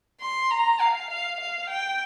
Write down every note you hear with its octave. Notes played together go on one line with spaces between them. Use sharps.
C6
A#5
F5
F5
F5
G5